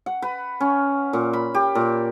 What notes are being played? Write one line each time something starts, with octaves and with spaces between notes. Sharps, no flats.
F#5
B4
C#4
A#2
B5
G4
A#2